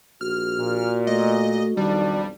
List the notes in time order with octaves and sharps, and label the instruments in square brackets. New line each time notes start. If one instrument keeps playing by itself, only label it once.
[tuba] A#1 [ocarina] F#4 [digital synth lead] F6
[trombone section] A#2
[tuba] A3 [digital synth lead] D#5
[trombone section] B1 F2 D4 [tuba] D#3 [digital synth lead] G3